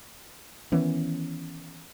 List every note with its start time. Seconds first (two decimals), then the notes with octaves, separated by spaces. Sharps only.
0.72 D#3 E3 B3 C#4